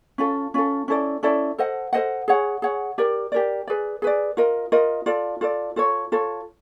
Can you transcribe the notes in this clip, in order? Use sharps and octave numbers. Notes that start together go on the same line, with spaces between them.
C#4 F4 A4
C#4 F4 A4
C#4 E4 A4 D5
C#4 E4 A4 D5
A4 C5 D#5 F#5
A4 C5 D#5 F#5
G#4 C#5 F#5
G#4 C#5 F#5
G4 A#4 D5
G4 A#4 D5
G#4 B4 D5
G#4 B4 D5
F4 A#4 D#5
F4 A#4 D#5
F4 A4 D5
F4 A4 D5
F4 A4 C#5
F4 A4 C#5